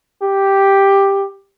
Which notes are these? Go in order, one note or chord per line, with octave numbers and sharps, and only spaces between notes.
G4